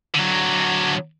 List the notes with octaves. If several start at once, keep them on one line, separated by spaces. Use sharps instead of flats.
D3 F#3